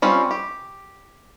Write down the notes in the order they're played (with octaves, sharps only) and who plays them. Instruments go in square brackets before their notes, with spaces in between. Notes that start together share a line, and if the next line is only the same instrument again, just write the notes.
[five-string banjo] G3 C4 C#4 F4
G4